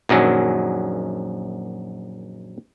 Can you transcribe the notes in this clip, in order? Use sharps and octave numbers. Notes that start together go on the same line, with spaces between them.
A#1 F#2 D#3 F#3